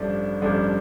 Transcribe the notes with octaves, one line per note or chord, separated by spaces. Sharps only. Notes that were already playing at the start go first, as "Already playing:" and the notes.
Already playing: A1 G2 F3 A3 D4
A1 G2 F3 A3 D4